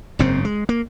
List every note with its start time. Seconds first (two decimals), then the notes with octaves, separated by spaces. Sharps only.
0.19 F#1 G#2 C#3 C4
0.45 G#3
0.69 A#3